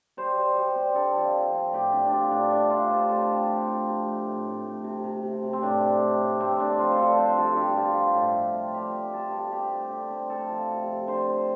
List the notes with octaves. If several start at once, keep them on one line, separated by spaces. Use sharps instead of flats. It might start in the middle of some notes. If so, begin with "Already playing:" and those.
G3 C5
G3
G3
C4
D3 A4
F3
C4
C4
A2 G4
C4 D4
D4
G3 F4
A2 D4
A3 D4
C3 F4
C3 C5
A3 A4
C3 G4
F3
C3
C3
A3
A2
A2
A3
C3
C3
C3
C3
C4
A2 D4
A2
A3
A2
A3 C4
D3 D4
F3 F4
C5
G2 A4
C4 C5
G2 A4
G2 G4
G2 F4
F3
A2
A3
C4
G3 G4
C4
G2 A4
G2
C4 G4
A3
D3
C4
A3 A4
F3
C3
C3
D3 C5
C4